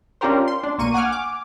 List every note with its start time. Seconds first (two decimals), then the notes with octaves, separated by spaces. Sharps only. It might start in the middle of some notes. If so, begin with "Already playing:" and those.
0.21 C#4 D4 F4 G4 A#4 C5
0.48 C6
0.63 D4
0.78 B1 A#3 C#6 D#7
0.94 F#5 G#5 D6 F6
1.12 D6